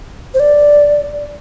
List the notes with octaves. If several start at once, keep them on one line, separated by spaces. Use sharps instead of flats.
C5
D5